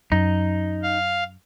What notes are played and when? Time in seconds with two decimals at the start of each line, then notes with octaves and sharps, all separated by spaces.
0.12 F#2 D#4
0.83 F5